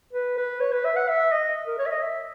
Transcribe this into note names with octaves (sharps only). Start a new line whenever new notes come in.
B4
B4
C#5
B4
E5
F#5
E5
D#5
A#4
C#5
E5
D#5
E5